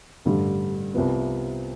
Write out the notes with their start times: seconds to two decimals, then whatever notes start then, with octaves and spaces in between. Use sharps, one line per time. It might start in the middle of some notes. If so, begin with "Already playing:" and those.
0.25 A1 G2 D3 G3
0.94 C2 C3 F3 B3